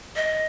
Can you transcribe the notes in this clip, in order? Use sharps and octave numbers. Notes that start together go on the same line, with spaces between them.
D#5